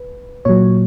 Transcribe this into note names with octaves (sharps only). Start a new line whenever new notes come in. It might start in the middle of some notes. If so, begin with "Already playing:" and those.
Already playing: B4
A#2 F#3 C#5